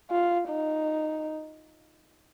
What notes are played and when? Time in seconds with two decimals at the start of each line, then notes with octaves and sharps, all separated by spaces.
0.11 F4
0.49 D#4